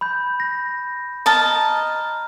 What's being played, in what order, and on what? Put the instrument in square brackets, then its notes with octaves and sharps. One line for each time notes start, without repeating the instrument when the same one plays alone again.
[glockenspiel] B5 G6
A#6
[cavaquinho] D#5 A5 [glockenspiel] A#5 F6